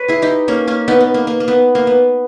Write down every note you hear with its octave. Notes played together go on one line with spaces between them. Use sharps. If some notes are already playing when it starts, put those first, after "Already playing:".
Already playing: B4 C#5
E4 G#4
D#4 G4
A#3 C#4
A#3 C#4
B3 D#4
B3
A#3
A#3
A#3
B3
A#3
B3